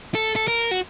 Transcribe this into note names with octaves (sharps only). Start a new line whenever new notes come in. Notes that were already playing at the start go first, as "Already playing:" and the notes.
A4
A4
A#4
F#4